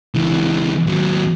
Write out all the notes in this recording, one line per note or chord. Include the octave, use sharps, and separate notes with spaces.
C#2 E3
D#2 F#3